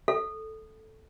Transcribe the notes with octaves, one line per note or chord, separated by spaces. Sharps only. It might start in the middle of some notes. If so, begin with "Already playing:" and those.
A4